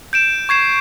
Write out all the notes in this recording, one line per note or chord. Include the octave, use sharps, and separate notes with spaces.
G6 D7 E7
C#6 G#6 C7 E7